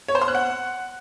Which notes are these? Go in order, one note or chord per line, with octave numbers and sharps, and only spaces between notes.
C#5
C5
C6
F#6
F#5